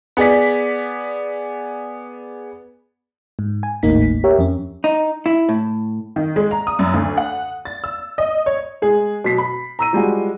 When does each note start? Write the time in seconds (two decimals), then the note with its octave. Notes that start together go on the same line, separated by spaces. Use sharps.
0.17 B3 G#4 D5 B6
3.39 G#2
3.63 G#5
3.83 G#1 D#2 A2 A#3 D#4 B6
4.24 G4 A#4 C#5 E5
4.38 F2 C#4
4.84 D#4
5.26 E4
5.49 A2
6.16 D#3
6.36 G#3
6.51 A#5
6.67 D#6
6.79 F#2
6.94 D2
7.17 F#5
7.65 A6
7.84 E6
8.18 D#5
8.46 C#5
8.82 G#3 G#4
9.24 B2 F#3 B6 C7
9.38 B5
9.79 A#5 E6 D#7
9.93 F3 G3 G#3 F#4